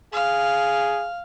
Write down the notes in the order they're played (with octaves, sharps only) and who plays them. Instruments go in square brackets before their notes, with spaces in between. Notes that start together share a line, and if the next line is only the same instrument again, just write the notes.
[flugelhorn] G#4 [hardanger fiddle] F5